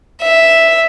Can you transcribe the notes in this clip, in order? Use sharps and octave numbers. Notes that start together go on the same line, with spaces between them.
E5